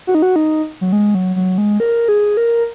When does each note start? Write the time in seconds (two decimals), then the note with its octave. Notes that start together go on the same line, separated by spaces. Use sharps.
0.07 F#4
0.15 D#4
0.22 F#4
0.36 D#4
0.81 F#3
0.92 G#3
1.15 F#3
1.36 F#3
1.58 G#3
1.80 A#4
2.08 G#4
2.37 A#4